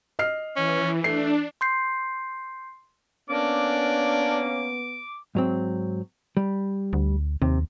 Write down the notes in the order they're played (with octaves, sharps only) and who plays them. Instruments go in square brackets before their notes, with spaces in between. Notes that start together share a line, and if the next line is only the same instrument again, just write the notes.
[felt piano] D#5 F6 C7
[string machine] E3 [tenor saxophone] C#4
[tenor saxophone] A3 [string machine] D4 [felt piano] C7
[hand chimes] C6 G6 C7
[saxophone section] A#3 C#4 [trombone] B3 [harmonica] D4 [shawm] D6
[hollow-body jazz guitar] G#2 F#3 C4
G3
[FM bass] D2
[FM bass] D#2 [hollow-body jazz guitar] C3